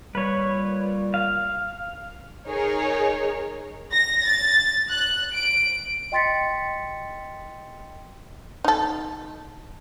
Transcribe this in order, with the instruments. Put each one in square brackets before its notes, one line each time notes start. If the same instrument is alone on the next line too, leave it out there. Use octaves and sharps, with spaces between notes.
[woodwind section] A#2 G3 [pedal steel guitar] B4 C#5
[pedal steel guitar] F5
[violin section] D#4 G#4 A#4 C#5
A#6
A6
F#6
D7
[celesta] D#5 G5 C6 A6 B6 C#7
[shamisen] D#4 A4